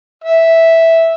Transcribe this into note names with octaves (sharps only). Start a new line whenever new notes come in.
E5